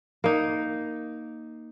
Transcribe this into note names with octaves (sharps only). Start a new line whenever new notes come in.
A#3 D#4